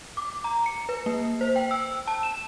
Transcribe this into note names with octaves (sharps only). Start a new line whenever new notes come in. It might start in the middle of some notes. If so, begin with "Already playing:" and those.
D6
A#5
C#7
B4
A#3
C5
G5
E6
A5
E7